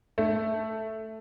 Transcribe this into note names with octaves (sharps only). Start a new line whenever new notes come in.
A3